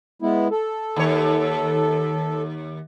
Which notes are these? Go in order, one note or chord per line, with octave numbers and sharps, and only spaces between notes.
G#3 B3 E4
A4
D#2 C#5